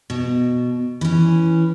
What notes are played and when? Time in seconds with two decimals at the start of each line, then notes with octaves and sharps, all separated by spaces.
0.10 B2
1.01 E3 C#4